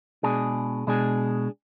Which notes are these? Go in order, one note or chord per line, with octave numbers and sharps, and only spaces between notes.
B2 G#3 D4 G#4
B2 G#3 D4 G#4